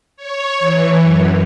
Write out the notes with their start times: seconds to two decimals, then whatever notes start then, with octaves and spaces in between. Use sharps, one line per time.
0.17 C#5
0.59 E3
1.01 F#2